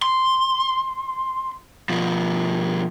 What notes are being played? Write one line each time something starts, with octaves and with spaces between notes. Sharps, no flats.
C6
B2 F3